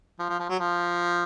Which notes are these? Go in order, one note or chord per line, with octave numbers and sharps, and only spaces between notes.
F3
F3
F3
F#3
F3